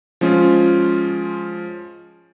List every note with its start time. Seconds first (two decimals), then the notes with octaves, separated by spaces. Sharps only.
0.21 F3 G#3 C#4 F4